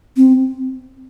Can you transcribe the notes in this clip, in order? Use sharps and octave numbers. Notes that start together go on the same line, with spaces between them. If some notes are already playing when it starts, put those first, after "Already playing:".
C4